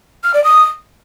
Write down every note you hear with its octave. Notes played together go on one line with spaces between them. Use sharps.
F6
D5
D#6